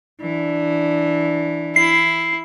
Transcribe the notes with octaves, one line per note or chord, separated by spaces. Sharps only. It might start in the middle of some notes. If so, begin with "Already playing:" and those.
E3 D4
E4 C7